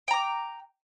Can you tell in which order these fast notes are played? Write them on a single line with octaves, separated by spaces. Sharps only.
G5 A#5 D6